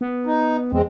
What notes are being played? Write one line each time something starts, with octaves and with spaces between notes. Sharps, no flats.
B3
D#4
E2 G#3 C4